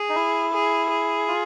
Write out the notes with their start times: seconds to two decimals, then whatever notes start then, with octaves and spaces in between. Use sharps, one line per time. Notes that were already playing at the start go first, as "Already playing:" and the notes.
Already playing: G#4
0.09 D#4
0.15 E4
0.53 G#4
0.90 G#4
1.28 F4